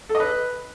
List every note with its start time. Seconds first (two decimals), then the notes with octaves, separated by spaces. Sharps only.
0.09 A4
0.15 D#5
0.20 B4